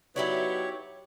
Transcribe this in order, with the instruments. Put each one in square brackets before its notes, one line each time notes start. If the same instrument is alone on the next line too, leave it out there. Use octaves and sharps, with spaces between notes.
[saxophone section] F#3 B3 D#4 [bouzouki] E4 G4 D5 [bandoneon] C#5